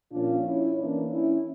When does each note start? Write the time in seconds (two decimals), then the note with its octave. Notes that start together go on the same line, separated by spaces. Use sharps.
0.12 A#2 F3 C#4 D4 F4
0.45 C#4 E4
0.77 E3 A#3 C#4 D4
1.10 C#4 E4